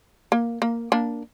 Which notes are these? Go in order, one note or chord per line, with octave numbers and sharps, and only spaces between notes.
A#3
A#3
A#3 D4